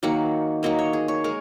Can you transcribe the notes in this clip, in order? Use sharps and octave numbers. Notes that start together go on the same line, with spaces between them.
D#3 F#3 A#3 F#5
D#3 F#3 A#3 D#5
C#5
G#4
C#5
G#3 A#4